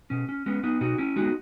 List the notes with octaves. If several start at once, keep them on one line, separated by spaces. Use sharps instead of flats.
B2 C#4
C#4
G#3 B3 C#4
B3 D#4
B2 D#4 F#4
C#4 E4
G#3 B3 D#4 F#4